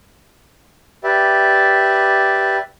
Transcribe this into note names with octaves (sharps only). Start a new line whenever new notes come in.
G4 B4 D5 E5